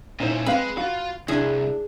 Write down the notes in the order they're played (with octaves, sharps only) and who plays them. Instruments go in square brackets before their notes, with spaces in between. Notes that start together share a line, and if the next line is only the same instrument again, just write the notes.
[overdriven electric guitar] A#2 C#4 [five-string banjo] D#4 E4 C5
[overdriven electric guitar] G#3 [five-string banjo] C4 B4 F5 [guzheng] B5
[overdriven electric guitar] F4 F5 [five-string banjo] F#4
[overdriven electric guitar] C2 [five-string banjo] D4 E4 [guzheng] G#4